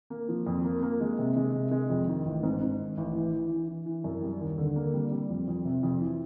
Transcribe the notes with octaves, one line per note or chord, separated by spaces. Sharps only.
A#3
F3
F2
A#3
A#3
G#3
C3
G#3
C3
G#3
F2
D#3
A1
G#2
G#2
D#3
A1
E3
E3
E3
E3
E3
F#2
G3
D#2
D3
A#3
G3
G3
F2
F2
C3
F2
E3